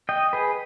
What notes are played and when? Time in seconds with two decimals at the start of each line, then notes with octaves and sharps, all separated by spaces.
0.09 D#5 G5
0.33 G#4 B4